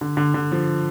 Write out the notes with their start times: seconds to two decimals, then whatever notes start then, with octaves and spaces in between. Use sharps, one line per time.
0.01 D3
0.17 D3
0.34 D3
0.52 F3